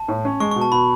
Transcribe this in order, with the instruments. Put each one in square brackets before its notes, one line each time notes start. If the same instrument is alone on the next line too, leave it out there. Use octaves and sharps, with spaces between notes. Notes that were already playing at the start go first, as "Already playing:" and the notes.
Already playing: [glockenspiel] A5
[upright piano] A2
C#4
[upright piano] G#3 [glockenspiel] C#6
[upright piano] B2 [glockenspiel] C#6
[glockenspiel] A5
[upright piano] B2 [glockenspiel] B5